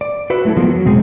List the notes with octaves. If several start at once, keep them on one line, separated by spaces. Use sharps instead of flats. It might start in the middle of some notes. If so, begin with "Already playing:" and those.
D5
F#4 B4 E5
F#3 A3 E4 F#4 A4
F3 F#3 G#3 A#3 B3 F4
F#3
E2 B2 G#3 C4 G#4